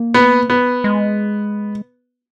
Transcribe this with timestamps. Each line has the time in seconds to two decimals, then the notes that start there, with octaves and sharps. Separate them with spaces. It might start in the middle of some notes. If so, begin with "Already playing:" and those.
Already playing: A#3
0.14 B3
0.50 B3
0.84 G#3